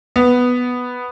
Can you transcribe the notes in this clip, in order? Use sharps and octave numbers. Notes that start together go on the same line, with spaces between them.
B3